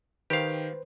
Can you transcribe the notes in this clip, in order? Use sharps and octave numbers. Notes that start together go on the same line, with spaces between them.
D#3 G4 B4 C5 F5